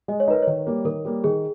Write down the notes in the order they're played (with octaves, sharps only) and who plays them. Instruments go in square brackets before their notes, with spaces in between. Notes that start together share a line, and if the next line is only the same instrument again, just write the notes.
[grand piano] G#3 [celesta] D#5
[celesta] C#5
[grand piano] D#4 A#4 [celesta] B4
[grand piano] D#3 [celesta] C#5
[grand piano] G3 A#3
[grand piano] D#3 [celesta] A#4
[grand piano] G3 A#3
[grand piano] D#3 [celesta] G#4